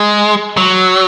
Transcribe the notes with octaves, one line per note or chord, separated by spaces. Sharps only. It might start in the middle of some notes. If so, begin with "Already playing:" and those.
Already playing: G#3
F#3